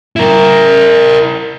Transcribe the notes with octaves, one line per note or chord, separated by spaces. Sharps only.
E4 A#4